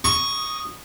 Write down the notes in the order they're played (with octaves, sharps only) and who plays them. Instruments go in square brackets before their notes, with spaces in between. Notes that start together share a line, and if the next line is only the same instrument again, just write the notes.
[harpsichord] C#6 [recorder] D#6